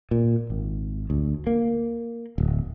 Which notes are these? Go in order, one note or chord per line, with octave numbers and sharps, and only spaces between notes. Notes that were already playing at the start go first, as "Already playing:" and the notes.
A#2
G#1
D2
A#3
D1